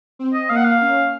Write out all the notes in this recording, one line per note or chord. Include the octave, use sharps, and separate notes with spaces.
C4
D#5
A#3 F5
F#5
F5
C#4